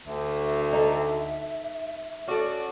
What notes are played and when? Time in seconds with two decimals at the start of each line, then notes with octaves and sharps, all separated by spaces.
0.07 D2 E5
0.73 D#4 A4
2.27 C#4 F#4 A4 D5